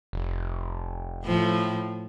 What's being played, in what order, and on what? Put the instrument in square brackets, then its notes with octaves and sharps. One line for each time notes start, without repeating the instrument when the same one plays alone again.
[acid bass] F1
[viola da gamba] A2 F3